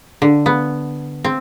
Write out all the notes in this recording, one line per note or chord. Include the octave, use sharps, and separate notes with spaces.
D3
B3
C4